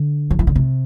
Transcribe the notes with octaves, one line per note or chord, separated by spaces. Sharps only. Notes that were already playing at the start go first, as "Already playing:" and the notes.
Already playing: D3
F#3
E3
D3
C3